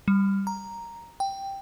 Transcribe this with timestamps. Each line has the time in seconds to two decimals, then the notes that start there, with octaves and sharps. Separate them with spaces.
0.08 G3
0.47 A#5
1.20 G5